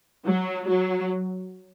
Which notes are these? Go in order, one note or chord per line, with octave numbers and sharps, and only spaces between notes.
F#3
F#3